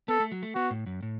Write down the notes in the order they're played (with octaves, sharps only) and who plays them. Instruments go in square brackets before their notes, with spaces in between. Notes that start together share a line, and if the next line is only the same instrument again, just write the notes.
[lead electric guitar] B3 [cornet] A4
[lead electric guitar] A3
F#3
A3
[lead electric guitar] B3 [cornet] F#4
[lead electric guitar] A2
F#2
A2